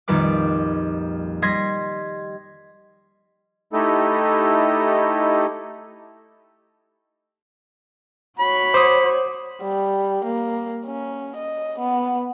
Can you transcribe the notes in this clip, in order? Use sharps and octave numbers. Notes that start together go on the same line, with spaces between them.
A#1 F2 D#3 G3 B4 D6
G3 D#5 C6 G#6 A#6 B6
A3 D#4 E4 G4 A4 D#5
F#4 C#5 B5
C5 D6 D#6
G3
A#3
C#4
D#5
B3